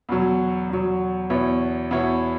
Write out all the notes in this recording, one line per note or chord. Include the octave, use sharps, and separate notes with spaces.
E2 B2 F#3
E2 B2 F#3
E2 B2 B3 E4 C#5
E2 B2 B3 E4 C#5